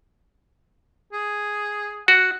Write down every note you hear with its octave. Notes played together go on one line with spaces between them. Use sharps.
G#4
F#4 F#5